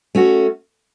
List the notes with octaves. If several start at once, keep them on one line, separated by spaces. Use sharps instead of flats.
A3 C#4 F#4